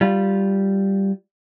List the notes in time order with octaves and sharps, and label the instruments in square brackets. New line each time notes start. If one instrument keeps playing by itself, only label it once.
[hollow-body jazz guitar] G3 F4